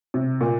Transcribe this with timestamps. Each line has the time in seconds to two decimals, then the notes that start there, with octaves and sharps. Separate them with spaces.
0.14 C3
0.41 A#2